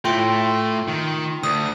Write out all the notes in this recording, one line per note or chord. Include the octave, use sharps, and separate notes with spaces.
A2 A3 F4 G5 C6
D#3
D2 D#6